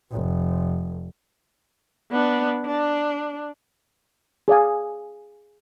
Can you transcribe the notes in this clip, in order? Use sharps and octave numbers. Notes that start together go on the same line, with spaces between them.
F1
B3 D4
D4
G#4 D5 F5 G#5